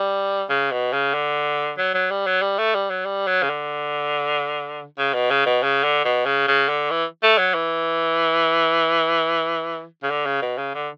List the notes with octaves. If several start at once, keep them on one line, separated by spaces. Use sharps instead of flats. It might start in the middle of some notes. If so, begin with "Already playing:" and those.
Already playing: G3
C#3
B2
C#3
D3
F#3
F#3
G3
F#3
G3
A3
G3
F#3
G3
F#3
C#3
D3
C#3
B2
C#3
B2
C#3
D3
B2
C#3
C#3
D3
E3
A3
F#3
E3
C#3
D3
C#3
B2
C#3
D3